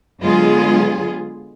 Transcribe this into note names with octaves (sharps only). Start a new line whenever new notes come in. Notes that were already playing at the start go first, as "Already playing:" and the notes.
D3 F#3 G#3 B3 F4 G#4